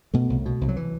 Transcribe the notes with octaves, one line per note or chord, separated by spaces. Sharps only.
B2 A3
C2
B2
C2
F#3
E3